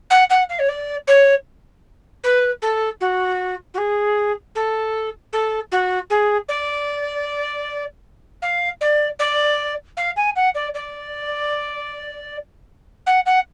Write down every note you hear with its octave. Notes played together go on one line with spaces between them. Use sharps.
F#5
F#5
F5
C#5
D5
C#5
B4
A4
F#4
F#4
G#4
A4
A4
F#4
G#4
D5
F5
D5
D5
F5
G#5
F#5
D5
D5
F#5
F#5